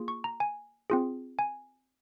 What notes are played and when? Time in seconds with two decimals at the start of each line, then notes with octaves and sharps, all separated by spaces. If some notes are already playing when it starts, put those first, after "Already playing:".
Already playing: A#3 F4 G#4
0.08 C#6
0.24 A#5
0.40 G#5
0.90 C4 F4 G#4
1.39 G#5